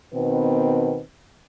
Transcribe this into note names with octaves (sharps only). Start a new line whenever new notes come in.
B2 D#3 B3 C4 B4